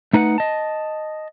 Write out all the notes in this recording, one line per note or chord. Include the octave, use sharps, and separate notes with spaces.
A3 D#4 B4 F5 F#5
D#5 A5